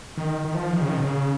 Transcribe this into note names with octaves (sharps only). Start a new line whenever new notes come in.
D#3
D#3
F3
D#3
C#3
D#3
B2
C#3